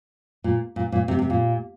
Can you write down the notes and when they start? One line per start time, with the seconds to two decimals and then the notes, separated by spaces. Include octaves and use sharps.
0.44 A#2
0.76 A#2
0.92 A#2
1.08 C3
1.19 C3
1.30 A#2